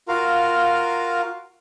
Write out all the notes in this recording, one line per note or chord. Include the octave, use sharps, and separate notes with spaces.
F4 F#4 A#4 F5